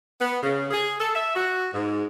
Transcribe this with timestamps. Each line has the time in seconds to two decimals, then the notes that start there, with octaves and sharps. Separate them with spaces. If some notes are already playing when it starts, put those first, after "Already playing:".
0.18 B3
0.42 C#3
0.71 G#4
0.99 A4
1.14 E5
1.34 F#4
1.72 G#2